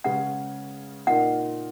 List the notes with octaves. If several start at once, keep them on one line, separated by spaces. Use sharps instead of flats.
C#3 G#3 C#4 G#4 B4 F#5
A#2 A#3 D#4 F#5